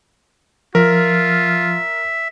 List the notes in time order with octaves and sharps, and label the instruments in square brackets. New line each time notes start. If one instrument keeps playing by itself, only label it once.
[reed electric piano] F3 [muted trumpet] F4 [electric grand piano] A#4 [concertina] E5